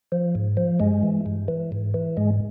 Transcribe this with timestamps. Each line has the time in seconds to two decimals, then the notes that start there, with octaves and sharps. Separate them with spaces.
0.12 F3
0.35 G#2
0.57 F3
0.80 G2 G#3
1.03 E3
1.26 G2
1.48 E3
1.72 G#2
1.94 E3
2.17 G#2 G#3